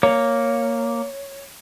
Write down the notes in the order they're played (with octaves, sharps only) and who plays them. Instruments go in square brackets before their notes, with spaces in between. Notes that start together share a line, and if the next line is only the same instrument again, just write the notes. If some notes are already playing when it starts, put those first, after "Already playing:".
[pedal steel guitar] A#3 [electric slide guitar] C#5